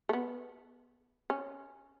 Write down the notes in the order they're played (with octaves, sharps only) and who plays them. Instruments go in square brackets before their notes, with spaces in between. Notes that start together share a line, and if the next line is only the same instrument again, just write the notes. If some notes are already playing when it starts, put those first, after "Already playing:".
[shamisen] A3
B3
C#4